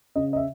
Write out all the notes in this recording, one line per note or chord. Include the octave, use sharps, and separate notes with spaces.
C#3 D#5
D#5
E5